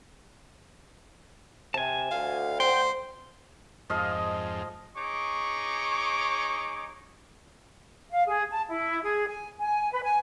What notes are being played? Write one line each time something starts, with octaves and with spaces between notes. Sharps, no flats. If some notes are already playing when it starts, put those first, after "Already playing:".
C3 G#5 A5
D2 F5
C5 G5
F2 G#2 F3 D#5 F5
D#4 G#4 C#5 C#6 D6
F5
G#4
A5
E4
G#4
G#5
G#5
B4
G#5